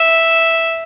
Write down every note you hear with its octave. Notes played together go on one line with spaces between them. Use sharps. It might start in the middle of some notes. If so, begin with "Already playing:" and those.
Already playing: E5